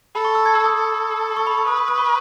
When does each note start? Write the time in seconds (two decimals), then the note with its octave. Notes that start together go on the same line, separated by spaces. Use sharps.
0.15 A4 B5
0.25 C#6
0.35 E6
0.46 G#6
0.55 E6
0.65 D#6
0.76 A4
1.37 C#6
1.47 B5
1.58 C#6
1.67 B4 D#6
1.77 D#6
1.88 D#6
1.98 C#6